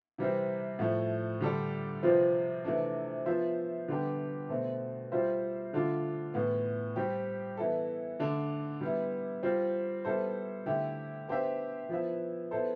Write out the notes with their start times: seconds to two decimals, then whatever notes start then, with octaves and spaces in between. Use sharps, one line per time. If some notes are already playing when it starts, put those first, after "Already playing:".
0.18 C3 E3 G3 C4
0.79 A2 F3 A3
1.40 D3 G3 D4 A4 D5
2.03 C3 F3 C4 F4 B4
2.64 C3 E3 A3 D4
3.26 F3 B3 F4 C5 E5
3.88 D3 G3 B3 D4 G4
4.49 B2 A3 C4
5.12 G3 C4 F4 C5 E5
5.73 D3 A3 D4 F4
6.34 A2 E3 B3
6.96 G3 C4 G4
7.57 E3 B3 E4 A4
8.19 D3 A3 D4
8.81 G3 B3 E4
9.43 G3 C4 F4
10.05 G3 B3 E4 A4 C5
10.66 D3 A3 E4 G4
11.28 B3 D4 G4 C5 E5
11.89 F3 B3 E4 B4 E5
12.51 B3 E4 A4 C5